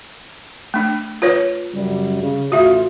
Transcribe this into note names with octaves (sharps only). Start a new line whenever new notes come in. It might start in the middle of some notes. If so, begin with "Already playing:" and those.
A3 D4
F4 B4 C#5
F#2 C#3 G3
C#3
A1 A2 F4 F#4 E5